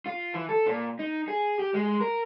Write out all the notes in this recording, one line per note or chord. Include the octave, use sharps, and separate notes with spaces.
F4
E3
A4
A#2
D#4
G#4
G4
G#3
A#4